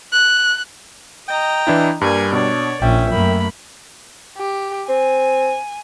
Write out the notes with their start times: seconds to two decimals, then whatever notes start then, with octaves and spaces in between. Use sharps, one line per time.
0.13 F#6
1.28 D#5 G5 A#5
1.67 E3 D4 E4
2.01 G2 G3 A#3 G#5
2.33 B2 D4 C#5 D5
2.82 A#1 C#4 E5 G5
3.11 F#2 A3 A#3 B5
4.37 G4
4.89 C4 G#5